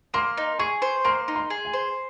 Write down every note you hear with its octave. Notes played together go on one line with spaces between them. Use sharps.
A#3 C6
D#4
G#4 C#6
C5
A#3 C6
D#4
C6
G#4
G#5
C5